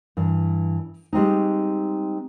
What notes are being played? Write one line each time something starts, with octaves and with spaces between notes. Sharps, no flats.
G2 E3
G3 G#3 C4 D#4